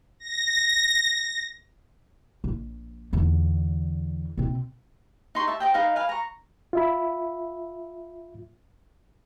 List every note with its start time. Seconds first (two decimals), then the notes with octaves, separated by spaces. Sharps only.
0.19 A#6
2.44 A#1
3.13 E2 D3
4.38 B2 C4
5.35 D#4 C6 C#6
5.48 E5 A5
5.60 C5 D5 D#5 G5
5.74 D#4 B4 D#5 F5
5.96 B4 F5 G#5
6.09 A#5 C#6
6.73 F4 E5 B5